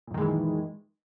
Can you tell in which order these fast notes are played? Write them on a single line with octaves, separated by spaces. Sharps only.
A#2 F#2 D#3 G#3 E3